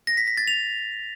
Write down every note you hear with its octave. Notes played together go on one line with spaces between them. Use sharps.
A#6
B6
B6
A6
F7